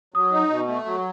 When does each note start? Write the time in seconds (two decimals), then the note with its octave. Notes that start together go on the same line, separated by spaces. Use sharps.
0.14 F#3 D#6
0.32 D#4
0.50 B2
0.68 A3
0.85 F#3